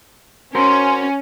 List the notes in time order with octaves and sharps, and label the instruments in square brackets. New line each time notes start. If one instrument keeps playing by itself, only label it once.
[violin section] C#4 [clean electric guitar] F#4 A#4 C5 [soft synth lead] C6